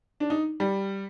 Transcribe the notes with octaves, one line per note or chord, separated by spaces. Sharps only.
D4
D#4
G3